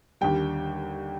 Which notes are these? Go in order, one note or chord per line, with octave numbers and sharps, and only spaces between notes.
D#2 D3 G3 G5